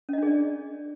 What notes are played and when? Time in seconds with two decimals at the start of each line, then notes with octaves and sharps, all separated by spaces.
0.09 C#4
0.13 D#5
0.18 D4
0.23 G#4
0.27 D5